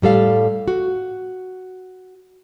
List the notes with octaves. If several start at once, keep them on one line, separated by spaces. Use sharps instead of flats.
A2 G3 A4 F5
F#4